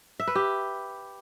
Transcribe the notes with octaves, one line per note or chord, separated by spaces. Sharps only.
E5
B4
G4